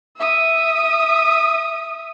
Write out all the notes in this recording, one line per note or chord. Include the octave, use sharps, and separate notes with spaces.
E5 D#6